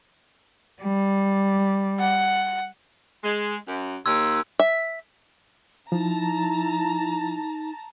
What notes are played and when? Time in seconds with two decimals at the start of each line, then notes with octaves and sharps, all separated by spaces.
0.82 G3
1.99 F#5
3.23 G#3
3.67 F#2
4.06 D#2 C6 E6 G#6
4.59 E5
5.92 F3 D#4 E4 A5 A#5